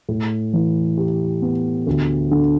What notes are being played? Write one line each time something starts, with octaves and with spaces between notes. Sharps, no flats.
A2
E3
G4
B3
D2
D3